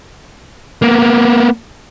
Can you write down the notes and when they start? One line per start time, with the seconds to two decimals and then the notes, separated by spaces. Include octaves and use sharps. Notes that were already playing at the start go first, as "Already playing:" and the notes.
0.82 A#3 B3